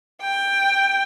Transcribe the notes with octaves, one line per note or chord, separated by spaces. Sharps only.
G5